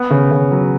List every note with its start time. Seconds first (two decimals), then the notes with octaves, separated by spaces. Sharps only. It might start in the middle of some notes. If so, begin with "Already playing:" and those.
Already playing: B3
0.10 C#3
0.31 C#3
0.51 F#3